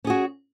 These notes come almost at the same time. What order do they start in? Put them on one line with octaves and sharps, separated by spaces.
C#4 G#4 F#4